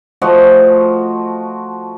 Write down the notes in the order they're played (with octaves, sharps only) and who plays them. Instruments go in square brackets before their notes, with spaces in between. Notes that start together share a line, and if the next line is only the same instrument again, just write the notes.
[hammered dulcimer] F3 A3 F#4 D#5